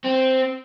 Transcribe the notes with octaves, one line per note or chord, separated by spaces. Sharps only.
C4